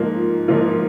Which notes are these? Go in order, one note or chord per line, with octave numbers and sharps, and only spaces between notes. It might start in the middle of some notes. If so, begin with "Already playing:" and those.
Already playing: G#2 F3 A#3 F4
G#2 F3 A#3 F4